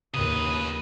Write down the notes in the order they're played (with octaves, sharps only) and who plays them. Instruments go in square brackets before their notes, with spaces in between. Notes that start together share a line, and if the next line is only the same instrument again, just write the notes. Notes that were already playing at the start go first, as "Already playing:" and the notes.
[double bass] D#2 [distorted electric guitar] C#3 B4 [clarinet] D#6